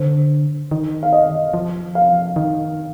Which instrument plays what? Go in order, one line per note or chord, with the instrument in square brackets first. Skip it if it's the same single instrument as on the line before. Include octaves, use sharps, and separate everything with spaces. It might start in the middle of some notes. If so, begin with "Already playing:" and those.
Already playing: [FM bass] D3 [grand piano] C5
[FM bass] D#3
[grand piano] F5
D#5
[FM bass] F3
[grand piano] F5
[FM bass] D#3